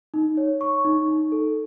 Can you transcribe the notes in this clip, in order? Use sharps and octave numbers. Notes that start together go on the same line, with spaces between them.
D#4
C#5
C#6
D#4
D#4
A4